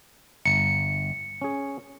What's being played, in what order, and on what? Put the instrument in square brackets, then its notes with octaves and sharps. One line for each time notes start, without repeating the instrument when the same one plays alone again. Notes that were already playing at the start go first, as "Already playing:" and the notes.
[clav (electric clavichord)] G1 A#5 [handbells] C#7
[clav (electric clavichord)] C#4 G#4